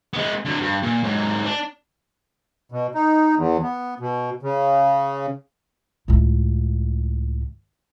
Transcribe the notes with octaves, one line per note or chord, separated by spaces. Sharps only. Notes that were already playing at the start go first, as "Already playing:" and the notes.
G#3 B3
D3 F#3
G2
A#2
G#2 F#3
D4
B2
D#4
E2
B3
B2
C#3
C#2 A2